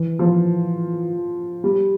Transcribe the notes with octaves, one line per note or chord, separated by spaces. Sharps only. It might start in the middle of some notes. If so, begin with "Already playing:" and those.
Already playing: E3
F3
G3